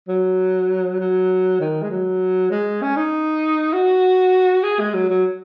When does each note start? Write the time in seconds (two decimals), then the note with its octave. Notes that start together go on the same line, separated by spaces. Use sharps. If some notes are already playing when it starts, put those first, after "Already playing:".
0.08 F#3
0.99 F#3
1.60 D#3
1.83 G#3
1.90 F#3
2.51 G#3
2.82 C#4
2.96 D#4
3.73 F#4
4.63 G#4
4.80 G#3
4.94 F#3
5.10 F#3